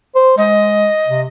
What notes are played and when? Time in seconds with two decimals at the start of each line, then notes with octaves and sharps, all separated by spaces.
0.15 C5
0.38 G#3 D#5
1.07 C3